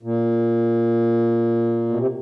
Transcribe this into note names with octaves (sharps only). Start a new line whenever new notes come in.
A#2
B2
C3